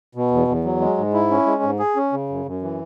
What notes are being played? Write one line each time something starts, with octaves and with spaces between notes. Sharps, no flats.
B2
E2
E2
F#3
G#3
G#2
E4
C#4
G#3
G#2
G#4
C#4
C#3
F#2
F#2
E3